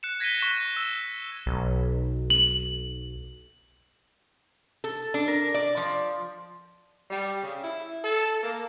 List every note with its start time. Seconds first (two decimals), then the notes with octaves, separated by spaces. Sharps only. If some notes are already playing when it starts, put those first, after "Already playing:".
0.03 F#6 C#7 E7
0.20 G#6 A#6 B6 C#7 D#7 G7
0.39 C#6 F#6 B6 E7 G7
0.77 E6
1.46 B1
2.30 F#7
4.84 A4
5.14 D4
5.28 A#4
5.54 D5
5.77 F3
7.11 G3
7.42 C#3
7.63 E4
8.04 A4
8.43 A#3